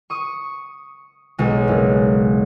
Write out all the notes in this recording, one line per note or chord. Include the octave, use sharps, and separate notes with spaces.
C#6 D#6
B1 G#3
F#1